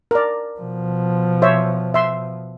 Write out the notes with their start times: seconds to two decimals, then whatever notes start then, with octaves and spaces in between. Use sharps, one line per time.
0.11 A#4 D5
0.60 B2 F3
1.42 C5 C#5 E5
1.94 E5 C6